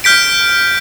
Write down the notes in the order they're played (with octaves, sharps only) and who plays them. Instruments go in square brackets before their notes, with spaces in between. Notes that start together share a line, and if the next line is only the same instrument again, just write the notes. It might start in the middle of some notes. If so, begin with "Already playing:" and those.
[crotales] F6 G6 B6 D7